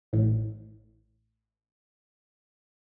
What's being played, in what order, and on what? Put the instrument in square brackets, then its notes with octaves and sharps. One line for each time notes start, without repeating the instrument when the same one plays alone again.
[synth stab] A1 A2